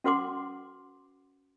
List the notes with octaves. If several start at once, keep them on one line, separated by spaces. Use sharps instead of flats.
C#4 F#4 B4 F#5 C6 D6